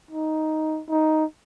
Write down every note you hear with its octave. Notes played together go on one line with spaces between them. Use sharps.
D#4
D#4